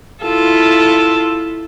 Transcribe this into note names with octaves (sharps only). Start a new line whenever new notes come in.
E4 F4 A4